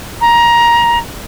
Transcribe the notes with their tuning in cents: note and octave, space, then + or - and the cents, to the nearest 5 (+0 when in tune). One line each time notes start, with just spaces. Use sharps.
A#5 +20